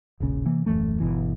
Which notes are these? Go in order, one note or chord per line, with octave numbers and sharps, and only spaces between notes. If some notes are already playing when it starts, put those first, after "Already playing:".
E1 A#1 C#3
C3 E3 A#3
D#1 F#2 E3 A3
G1 B2 E3